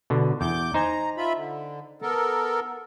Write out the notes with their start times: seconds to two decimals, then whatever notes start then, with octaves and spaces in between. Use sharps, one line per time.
0.10 B2 D3
0.41 E2 D6 G6
0.74 D#4 C5 G#5 A#5
1.17 F4 E5 B5
1.36 D3
2.02 B3 A4 A#4